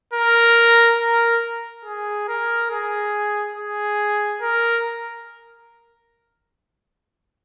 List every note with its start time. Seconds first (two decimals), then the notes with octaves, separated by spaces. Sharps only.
0.14 A#4
0.99 A#4
1.85 G#4
2.28 A#4
2.71 G#4
3.56 G#4
4.42 A#4